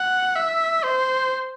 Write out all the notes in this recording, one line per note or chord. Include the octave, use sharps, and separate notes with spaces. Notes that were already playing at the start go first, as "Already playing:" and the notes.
Already playing: F#5
E5
C5